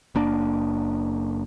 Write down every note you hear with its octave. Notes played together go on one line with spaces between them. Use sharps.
F#1 A#3 D4